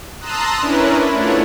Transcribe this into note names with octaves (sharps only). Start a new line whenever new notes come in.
A5 A#5 C6 D#6 E6 F#6
C#4 D4 E4 A#4 B4
A3 D4 E4 F4 C#5 F#5